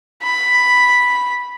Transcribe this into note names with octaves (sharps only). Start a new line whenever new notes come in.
B5